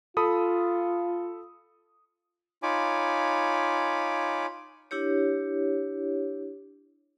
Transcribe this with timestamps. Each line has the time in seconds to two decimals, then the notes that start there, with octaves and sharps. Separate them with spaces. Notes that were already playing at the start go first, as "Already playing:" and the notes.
0.17 F4 A4 B5 D#6
2.63 D#4 F4 C#5 G#5 B5 D6
4.91 D4 E4 G4 C#5